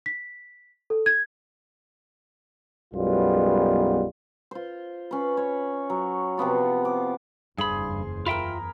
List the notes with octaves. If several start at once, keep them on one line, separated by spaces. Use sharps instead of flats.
B6
A4
G#6
B1 F#2 G3 G#3 B3 F4
F4 C5
C#4 B4
C#5
F#3
C3 F3 B3 F4
D6
F#1 E2 G2 G#4 C5 B5
F4 A#4 E5 G5 B5